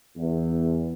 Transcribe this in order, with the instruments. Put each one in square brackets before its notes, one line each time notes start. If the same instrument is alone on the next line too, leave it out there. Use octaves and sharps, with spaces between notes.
[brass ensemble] E2